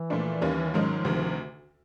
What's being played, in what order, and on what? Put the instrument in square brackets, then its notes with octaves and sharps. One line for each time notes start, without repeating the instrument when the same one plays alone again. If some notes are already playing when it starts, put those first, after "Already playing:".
Already playing: [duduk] E3
[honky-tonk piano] A#2 F3 A3 D4
D#2 D#3 G3 A#3 C#4
[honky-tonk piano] G#2 D#3 G#3 C#4 [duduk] F3
[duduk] F#3
F3
[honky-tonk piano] D2 C3 D#3